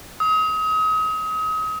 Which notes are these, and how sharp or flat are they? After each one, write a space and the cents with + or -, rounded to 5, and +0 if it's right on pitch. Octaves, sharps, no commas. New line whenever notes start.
D#6 +35